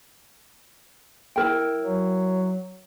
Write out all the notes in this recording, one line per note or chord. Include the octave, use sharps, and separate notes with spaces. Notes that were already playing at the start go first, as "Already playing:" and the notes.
E4 A#4 G5
F#3